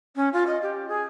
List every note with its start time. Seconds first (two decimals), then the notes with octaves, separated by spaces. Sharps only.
0.15 C#4
0.32 F4
0.46 D#5
0.62 G4
0.88 G#4